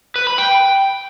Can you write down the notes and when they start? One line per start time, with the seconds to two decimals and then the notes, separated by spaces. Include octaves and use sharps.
0.16 B4
0.27 B5
0.38 G5